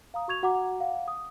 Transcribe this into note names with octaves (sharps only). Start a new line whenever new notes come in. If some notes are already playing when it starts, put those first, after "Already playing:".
F5 A#5 D#6
F#4 C#6 G#6 F7
F#4 F#5 A#5 D6
F5 F#5
D#6